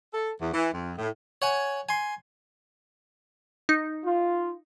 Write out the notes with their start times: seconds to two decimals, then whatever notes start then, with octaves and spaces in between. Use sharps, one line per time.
0.13 A4
0.40 E2
0.53 E3
0.72 F2
0.98 A2
1.42 C#5 F#5 G#5
1.89 G#5 C6
3.69 D#4
4.04 F4